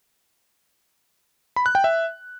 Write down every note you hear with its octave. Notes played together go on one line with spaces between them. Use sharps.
B5
F#6
G5
E5